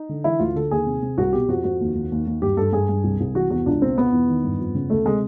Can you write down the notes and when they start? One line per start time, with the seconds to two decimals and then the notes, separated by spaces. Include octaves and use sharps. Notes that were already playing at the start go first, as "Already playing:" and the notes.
Already playing: D#4
0.09 D3
0.24 E3 E4
0.40 D2 F4
0.55 D3 A4
0.71 D#2 G#4
0.86 C3
1.02 C3
1.18 C2 F#4
1.33 B2 G4
1.48 F2 F#4
1.64 F2 F#4
1.81 D#2
1.95 D#2
2.12 D#2
2.27 D#2
2.41 G2 G4
2.57 G2 A4
2.72 G2 G#4
2.89 G2
3.04 C2
3.20 C2
3.35 E3 F#4
3.50 E2 F#4
3.66 C#2 D4
3.82 B2 C4
3.97 B2 B3
4.13 E2
4.28 D#3
4.44 G2
4.59 F2
4.75 C#3
4.90 D2 A3
5.05 C3 G#3